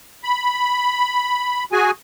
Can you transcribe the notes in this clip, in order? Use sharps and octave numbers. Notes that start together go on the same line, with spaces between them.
B5
F#4 G#4 G#5